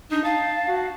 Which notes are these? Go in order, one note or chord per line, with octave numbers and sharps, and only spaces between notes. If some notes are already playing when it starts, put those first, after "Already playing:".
D4 D#4
F5 A5
F#4